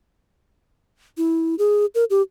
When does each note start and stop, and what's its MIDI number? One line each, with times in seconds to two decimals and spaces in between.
1.17 1.55 64
1.59 1.86 68
1.95 2.04 70
2.10 2.22 67